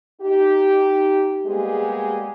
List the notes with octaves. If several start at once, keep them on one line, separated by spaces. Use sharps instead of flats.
D#4 G4
G3 G#3 A#3 B3 G4 G#4